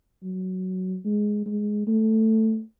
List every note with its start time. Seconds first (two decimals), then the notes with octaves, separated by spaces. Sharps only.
0.23 F#3
1.05 G#3
1.46 G#3
1.87 A3